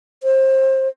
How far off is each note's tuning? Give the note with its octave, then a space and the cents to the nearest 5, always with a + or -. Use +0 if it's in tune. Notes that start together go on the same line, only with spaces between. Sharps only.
C5 +25